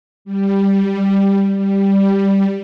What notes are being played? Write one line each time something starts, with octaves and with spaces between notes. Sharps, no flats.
G3
G3